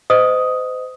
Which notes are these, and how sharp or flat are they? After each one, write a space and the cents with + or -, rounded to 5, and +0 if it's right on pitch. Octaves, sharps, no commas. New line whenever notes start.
C5 -35 D#5 +0 D#6 +5